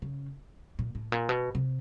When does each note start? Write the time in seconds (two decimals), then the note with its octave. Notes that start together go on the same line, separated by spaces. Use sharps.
0.02 C#3
0.79 A#2
0.95 A2
1.12 A#2
1.29 B2
1.55 C3